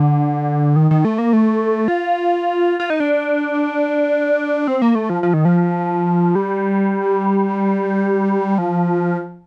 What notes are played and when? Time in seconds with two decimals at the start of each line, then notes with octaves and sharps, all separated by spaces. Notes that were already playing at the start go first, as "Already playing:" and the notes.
Already playing: D3
0.76 D#3
0.91 D#3
1.05 A3
1.18 A#3
1.33 A3
1.88 F4
2.80 F4
2.90 D#4
3.00 D4
4.68 C4
4.82 A#3
4.95 A3
5.10 F3
5.23 F3
5.34 D#3
5.45 F3
6.35 G3
8.58 F3